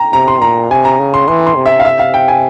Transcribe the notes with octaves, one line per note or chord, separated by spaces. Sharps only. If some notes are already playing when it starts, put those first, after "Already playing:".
Already playing: G5 A#5
C3 A#5
C6
A#2 A#5
C3 G#5
A#5
C#3
C6
E3 C6
C6
C3
E5
F5
C3 E5
F5
G5
G#5